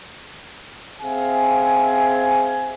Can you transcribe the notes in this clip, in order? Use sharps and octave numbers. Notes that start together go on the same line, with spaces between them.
C4 G#4 E5 F5 G#5